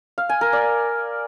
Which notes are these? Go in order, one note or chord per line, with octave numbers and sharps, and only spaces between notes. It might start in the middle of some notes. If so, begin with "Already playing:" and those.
F5
G#5
A#4
D5